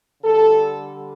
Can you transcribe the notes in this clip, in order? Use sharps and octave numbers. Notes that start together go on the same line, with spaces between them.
D3 G3 A4